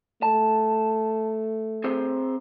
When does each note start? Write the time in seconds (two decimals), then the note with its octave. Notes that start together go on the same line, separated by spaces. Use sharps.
0.23 A3 A5
1.84 C4 G#4 C5